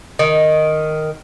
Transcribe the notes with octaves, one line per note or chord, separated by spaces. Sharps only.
D#3